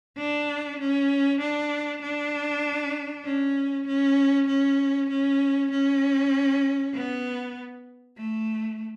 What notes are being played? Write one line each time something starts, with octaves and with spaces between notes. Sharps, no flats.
D4
C#4
D4
D4
C#4
C#4
C#4
C#4
C#4
B3
A3